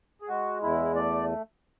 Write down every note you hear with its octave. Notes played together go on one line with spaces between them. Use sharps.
G#4
G#3 F#4
E2 E4
A3 D5